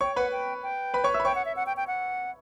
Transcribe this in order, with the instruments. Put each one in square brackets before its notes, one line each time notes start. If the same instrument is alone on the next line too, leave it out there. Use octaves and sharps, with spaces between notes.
[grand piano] C#5 C#6 [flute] G5
[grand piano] B4 B5 [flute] F#5
[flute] G5
G5
[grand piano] B4 B5
C#5 C#6
E5 E6
B5
[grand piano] C#5 C#6 [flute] G5
[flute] F#5
E5
F#5
G5
G5
F#5